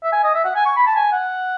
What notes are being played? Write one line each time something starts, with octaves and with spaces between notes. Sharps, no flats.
E5
G#5
D#5
E5
F#5
G#5
C#6
B5
A5
G#5
F#5